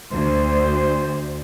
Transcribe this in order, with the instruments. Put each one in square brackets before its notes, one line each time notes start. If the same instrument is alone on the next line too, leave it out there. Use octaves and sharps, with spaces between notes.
[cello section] D2 [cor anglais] C5